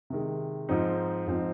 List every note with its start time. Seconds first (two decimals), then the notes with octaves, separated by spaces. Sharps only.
0.10 C3 D#3 G#3
0.69 G#2 F3 C4 D#4
1.27 G#2 F3 C4 D#4